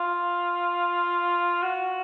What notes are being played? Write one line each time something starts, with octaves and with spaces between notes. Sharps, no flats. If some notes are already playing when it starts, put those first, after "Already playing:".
Already playing: F4
F#4